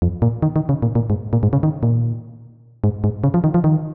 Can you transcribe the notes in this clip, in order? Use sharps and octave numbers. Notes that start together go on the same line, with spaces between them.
F2
A#2
D#3
D#3
C#3
A#2
A#2
G#2
A#2
G#2
C#3
D#3
A#2
G#2
G#2
C#3
F3
D#3
F3
D#3